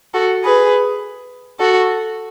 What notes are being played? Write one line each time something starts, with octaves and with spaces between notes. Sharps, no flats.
F#4 A4
G#4 B4
F#4 A4